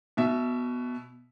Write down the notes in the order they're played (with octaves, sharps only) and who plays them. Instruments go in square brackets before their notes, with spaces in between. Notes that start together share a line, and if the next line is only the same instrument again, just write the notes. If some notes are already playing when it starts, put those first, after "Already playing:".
[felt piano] B2 E5